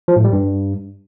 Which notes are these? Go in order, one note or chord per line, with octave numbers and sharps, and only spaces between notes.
F3
A2
G3
G2